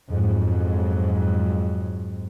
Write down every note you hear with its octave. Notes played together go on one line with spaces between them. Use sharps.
F2 G#2 F#3